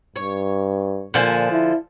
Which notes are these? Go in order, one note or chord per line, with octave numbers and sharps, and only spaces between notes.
G2 C#5
A#2 D3 F3 G#5
E4